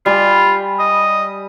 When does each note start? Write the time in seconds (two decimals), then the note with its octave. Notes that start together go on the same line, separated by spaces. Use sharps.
0.06 G3 F4 G#5
0.79 D#5